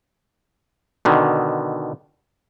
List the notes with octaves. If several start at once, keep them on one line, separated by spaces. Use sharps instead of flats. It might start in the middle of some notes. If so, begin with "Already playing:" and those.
B2 D3 D#3